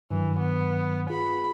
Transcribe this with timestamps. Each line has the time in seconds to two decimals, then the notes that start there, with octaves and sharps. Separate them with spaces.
0.11 G2 D#3 E3 F#3
0.39 B3
1.10 F4 G#4 B5